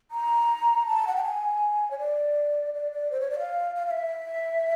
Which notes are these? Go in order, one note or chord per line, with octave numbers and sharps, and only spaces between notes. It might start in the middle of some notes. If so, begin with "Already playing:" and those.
A#5
A5
F#5
G5
G#5
C#5
D5
D5
D5
C5
C#5
D5
F5
F5
F5
E5